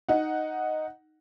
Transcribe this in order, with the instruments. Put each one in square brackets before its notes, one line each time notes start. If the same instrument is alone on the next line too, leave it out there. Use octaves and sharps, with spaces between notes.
[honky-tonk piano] D#4 F#5